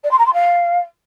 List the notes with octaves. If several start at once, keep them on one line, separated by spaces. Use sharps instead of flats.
D5
C6
A#5
C6
F5